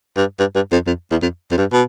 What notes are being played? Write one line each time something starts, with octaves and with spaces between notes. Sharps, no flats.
G2
G2
G2
F2
F2
E2
F2
F2
G2
B2